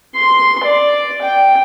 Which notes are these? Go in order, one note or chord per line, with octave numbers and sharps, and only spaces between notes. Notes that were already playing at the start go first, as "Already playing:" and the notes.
C6
D5
G5